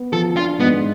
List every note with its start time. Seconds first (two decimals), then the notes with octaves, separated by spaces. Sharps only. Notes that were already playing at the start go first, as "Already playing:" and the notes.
Already playing: B3
0.13 F3 A4
0.37 D4 F4
0.60 G#2 B3